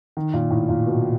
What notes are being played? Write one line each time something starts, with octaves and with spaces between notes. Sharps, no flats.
D#3
A#2
A2
A#2
B2